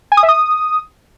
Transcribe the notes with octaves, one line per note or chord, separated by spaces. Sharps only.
G#5
D#6
E5
D#6